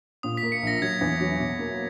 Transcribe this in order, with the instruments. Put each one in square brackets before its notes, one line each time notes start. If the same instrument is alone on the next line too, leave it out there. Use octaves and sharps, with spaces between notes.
[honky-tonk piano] A#2 [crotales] D#6
[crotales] B6
[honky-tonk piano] A#3
[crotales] C#7
[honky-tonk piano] A#1 [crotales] A#6
[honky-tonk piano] F#3 [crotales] G#6
[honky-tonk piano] E2
F#3
B2
A#3